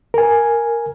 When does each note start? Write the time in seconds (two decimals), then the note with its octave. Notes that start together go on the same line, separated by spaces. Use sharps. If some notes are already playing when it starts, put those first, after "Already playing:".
0.14 A#4 G#5